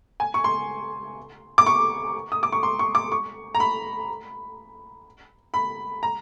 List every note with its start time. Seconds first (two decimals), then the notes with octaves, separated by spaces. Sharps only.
0.20 G#5
0.34 C#6
0.44 C6
1.58 D6
1.66 C#6
2.32 D#6
2.43 D6
2.52 C#6
2.63 C6
2.79 C#6
2.95 D6
3.12 C#6
3.55 A#5
3.60 B5
5.54 B5
6.03 A#5